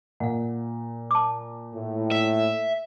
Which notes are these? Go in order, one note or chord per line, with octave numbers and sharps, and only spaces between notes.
A#2 F5 F#5
A5 D6
A2
E5